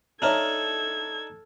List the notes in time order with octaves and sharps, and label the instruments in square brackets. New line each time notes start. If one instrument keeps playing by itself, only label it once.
[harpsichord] D4 D#4 A#5 [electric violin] A4 G#6 [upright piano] C#5 E5 F6